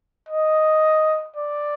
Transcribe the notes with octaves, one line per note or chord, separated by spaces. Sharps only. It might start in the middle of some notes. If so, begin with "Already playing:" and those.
D#5
D5